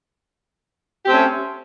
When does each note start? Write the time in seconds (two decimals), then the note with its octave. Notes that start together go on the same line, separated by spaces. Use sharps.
1.03 G4
1.06 C4
1.09 A3
1.13 C#4